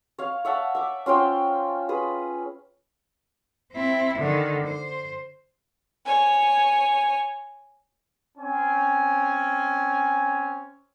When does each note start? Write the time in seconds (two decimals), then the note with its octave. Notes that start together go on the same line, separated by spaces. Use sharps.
0.18 C#5 F5
0.45 C#5 E5 F#5 A5
0.75 E5 D6
1.06 C#4 F4 C5 G5
1.89 G#4 B4 D#6
3.72 C4 E4
4.18 D3 D#3
4.66 C5
6.06 C#5 G#5
8.37 C4 C#4 G#5